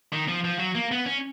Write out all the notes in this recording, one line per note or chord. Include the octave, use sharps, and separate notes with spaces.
D#3
F3
F3
F#3
A#3
B3
C#4